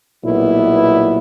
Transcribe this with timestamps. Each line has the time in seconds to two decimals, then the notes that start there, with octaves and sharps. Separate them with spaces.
0.23 B1 A#2 G3 B3 E4